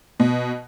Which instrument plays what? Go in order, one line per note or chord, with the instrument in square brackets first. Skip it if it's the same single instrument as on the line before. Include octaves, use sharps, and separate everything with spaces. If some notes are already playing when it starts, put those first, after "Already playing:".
[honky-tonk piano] B2